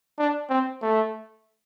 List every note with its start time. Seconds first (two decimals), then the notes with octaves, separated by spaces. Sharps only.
0.19 D4
0.49 C4
0.82 A3